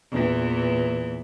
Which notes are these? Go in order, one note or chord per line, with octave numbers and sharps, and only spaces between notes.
E2 A#2 E3